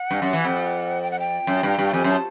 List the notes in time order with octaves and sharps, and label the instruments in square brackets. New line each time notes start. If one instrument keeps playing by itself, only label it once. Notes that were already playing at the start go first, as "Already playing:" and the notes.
Already playing: [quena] F#5
[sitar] G2
F#2
E3
F2
[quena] G5
F#5
G5
[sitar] F#2
G2
G2
[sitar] F2 [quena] G#5
[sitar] F#2 [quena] A5